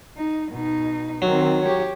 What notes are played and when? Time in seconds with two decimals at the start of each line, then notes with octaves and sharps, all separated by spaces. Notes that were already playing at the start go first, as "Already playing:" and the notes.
0.17 D#4
0.52 B2 D#4
1.22 D#3 F#3 C4
1.63 G4 C#5